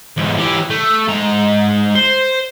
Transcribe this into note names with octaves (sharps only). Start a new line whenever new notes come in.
E2 G#2
E3 G4
A3
G#2 A#5
C5